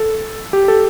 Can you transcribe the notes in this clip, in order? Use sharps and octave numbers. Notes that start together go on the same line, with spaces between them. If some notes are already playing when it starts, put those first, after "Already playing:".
Already playing: A4
G4
A4